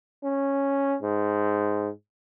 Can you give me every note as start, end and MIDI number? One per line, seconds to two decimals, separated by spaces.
0.24 0.96 61
1.03 1.89 44